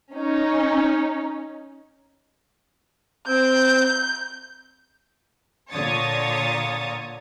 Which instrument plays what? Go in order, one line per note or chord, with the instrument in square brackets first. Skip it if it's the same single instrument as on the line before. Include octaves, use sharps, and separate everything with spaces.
[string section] C#4 D#4
[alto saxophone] C4 [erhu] G6
[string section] A#2 D3 C#5 D#6 A6